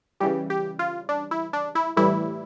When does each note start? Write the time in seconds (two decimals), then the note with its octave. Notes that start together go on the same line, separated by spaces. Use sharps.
0.20 C#3 E3 G3 G4
0.50 G4
0.79 F4
1.09 D4
1.31 E4
1.53 D4
1.75 E4
1.96 A2 E3 G3 E4